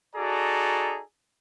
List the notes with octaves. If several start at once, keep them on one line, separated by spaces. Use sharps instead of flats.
D#4 F#4 G#4 A4 D5 A#5